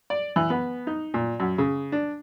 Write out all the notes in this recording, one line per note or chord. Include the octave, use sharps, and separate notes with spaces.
D5
E3
B3
D#4
A#2
F#2
C#3
D4